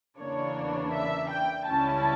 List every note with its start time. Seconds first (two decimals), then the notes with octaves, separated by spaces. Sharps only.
0.19 E2 C#3 E3 A#3 D4 C#5
0.93 E5
1.30 G5
1.67 C#2 C#3 G3 C#4 E4 A5